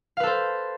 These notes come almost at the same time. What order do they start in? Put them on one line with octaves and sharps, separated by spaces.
F5 B4 A4 C5